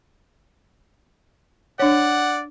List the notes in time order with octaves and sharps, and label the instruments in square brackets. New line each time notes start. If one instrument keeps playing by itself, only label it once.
[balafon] D4 C#5 [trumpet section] D5 F#5